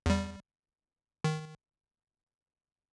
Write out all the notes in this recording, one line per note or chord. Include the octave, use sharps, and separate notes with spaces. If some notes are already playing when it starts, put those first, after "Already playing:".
E2 G3
D#3